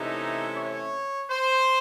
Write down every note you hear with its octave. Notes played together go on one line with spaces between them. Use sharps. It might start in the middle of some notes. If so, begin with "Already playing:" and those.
Already playing: C3 E3 A3 C#4 D#4
C#5
C5